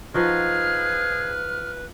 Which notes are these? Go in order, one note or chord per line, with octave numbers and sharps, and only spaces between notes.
F3 D#4 F#4 G#4 B4 F6